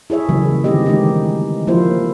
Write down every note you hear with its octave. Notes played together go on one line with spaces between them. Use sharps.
E4 G#4 C#5 E5
C#3 E3 F#3 G3 A#3
D3 D#3 A3 C4 G4 D#5
E3 G#3 C#4 D#4 G4
F3 A#3 E4 F4 G4 C5